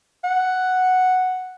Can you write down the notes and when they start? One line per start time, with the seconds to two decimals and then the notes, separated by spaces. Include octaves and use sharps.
0.24 F#5